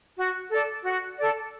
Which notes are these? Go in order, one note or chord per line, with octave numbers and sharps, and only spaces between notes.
F#4
A4 D5
F#4
A4 D5